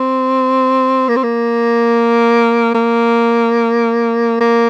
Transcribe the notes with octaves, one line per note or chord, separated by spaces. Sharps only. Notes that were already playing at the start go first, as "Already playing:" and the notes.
Already playing: C4
A#3
C4
A#3
A#3
A#3